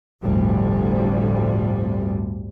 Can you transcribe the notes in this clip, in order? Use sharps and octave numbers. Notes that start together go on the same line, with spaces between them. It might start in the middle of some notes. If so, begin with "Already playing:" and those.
G1 D2 A2 C3 F3 G3